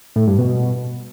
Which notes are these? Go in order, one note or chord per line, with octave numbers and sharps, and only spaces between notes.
A2
G2
B2